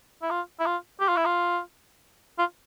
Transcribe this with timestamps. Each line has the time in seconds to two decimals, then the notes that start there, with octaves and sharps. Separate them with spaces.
0.22 E4
0.30 F4
0.60 E4
0.66 F4
1.00 G4
1.08 F4
1.17 E4
1.25 F4
2.39 F4